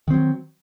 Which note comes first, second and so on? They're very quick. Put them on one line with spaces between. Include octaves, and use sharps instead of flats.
D#3 C4 F#3